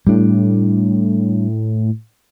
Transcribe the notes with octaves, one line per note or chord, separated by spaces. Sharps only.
A2 G3 D4